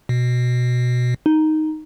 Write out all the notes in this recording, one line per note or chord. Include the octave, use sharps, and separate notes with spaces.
B2
D#4